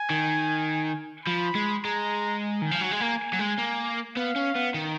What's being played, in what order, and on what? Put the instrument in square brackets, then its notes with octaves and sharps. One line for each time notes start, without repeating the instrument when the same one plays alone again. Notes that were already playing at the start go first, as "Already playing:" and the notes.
Already playing: [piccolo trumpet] G#5
[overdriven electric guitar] D#3
[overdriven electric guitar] F3 [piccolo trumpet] B5
[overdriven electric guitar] G#3
[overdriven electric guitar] G#3 [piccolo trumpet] A#5
[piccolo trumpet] G#5
[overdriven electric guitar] D#3
F3
F#3
G#3
A#3
F#3
G#3
A#3
[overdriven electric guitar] B3 [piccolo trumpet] F5
[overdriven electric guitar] C#4
B3
D#3